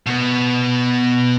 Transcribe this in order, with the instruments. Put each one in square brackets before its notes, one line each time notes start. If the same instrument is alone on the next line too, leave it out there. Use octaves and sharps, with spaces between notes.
[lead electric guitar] B2 B3